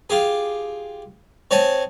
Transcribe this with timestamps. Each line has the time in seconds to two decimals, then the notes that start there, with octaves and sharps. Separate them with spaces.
0.10 F4 G4 G#4
1.51 C4 C#5 D#5 G#5 A5